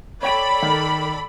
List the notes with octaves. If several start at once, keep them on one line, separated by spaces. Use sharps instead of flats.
A4 C#5 D5 G5 B5 D7
D#3